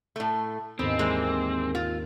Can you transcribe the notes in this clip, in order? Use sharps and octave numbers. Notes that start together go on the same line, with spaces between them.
A2 A3
D#2 G#2 B3 C4
E3 G#3 A#3
F4